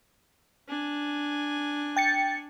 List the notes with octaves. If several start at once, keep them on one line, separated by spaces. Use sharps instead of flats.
D4 G#5
G5 A6 C#7